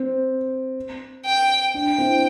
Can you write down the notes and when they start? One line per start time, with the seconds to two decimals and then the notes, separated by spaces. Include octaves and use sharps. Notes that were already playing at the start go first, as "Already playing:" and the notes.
Already playing: C4
1.26 G5
1.74 D4 G5
1.98 C4 E4